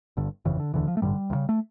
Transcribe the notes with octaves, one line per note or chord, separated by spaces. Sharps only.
G1 G2 D3
G1 F2 C#3 E3
D3
E1 D2 D3 E3
F3
A3
A1 G2 D3 G3
D2
C#3
A3